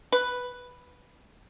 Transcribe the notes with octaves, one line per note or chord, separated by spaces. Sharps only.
B4